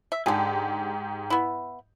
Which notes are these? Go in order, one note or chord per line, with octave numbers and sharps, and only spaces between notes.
E5
G#2 D3 G4 G#4
B3 E4